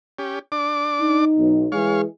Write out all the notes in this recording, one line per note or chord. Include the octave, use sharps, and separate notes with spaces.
C#4 G4
D4 D6
D#4
B1
E3 G#3 G#4 C#5 F5